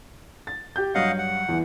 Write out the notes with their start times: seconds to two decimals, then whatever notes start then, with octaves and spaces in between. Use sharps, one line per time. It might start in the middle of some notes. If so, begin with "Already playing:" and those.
0.47 A6
0.76 G4 G6
0.95 G2 F#3 D#5 F5 F#5
1.18 F#5
1.49 E2 E3